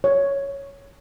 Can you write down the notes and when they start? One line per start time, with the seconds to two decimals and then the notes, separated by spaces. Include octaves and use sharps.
0.04 C#5